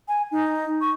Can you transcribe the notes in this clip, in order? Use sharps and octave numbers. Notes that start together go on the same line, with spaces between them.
G#5
D#4
C#6